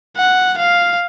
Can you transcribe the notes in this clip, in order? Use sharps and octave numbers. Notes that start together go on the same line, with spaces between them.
F#5
F5